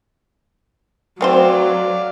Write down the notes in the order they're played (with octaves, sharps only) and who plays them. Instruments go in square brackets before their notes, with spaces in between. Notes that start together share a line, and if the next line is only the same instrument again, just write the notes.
[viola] F#3 [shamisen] A3 C4 C5 [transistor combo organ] D5 F5